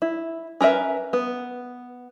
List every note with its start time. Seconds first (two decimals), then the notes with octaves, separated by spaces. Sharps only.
0.02 E4
0.61 C#4 A#4 B4 E5
1.13 B3